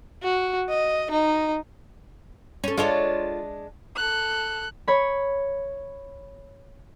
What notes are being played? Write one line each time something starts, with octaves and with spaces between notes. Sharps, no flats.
F#4
D#5
D#4
C#4 A4
G#3 D4 F4 A4 C#5
A4 F#6
C#5 B5